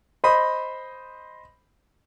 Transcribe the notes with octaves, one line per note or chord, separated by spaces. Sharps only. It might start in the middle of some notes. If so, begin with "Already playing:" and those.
C5 D#5 B5